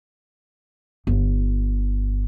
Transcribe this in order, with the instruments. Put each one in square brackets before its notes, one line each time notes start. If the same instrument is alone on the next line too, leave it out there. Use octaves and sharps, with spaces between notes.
[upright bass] G1